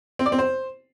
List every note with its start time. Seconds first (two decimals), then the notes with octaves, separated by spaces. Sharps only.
0.19 C4
0.26 D5
0.32 C4
0.39 C5